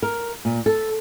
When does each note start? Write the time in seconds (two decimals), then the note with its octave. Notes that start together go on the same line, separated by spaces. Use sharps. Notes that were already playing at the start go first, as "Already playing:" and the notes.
0.02 A#4
0.45 A#2
0.66 A4